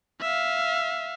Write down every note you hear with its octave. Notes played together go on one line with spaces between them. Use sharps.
E5 F5